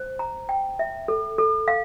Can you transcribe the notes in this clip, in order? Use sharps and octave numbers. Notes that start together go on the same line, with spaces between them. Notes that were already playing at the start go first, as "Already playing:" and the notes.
Already playing: C5
A#5
G5
E5
A4
A4
F5